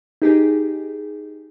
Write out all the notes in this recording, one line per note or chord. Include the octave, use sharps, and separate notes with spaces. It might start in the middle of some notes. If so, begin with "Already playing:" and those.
D#4 G4 G#4